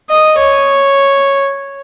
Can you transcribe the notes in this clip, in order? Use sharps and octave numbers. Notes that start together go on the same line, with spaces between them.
D#5
C#5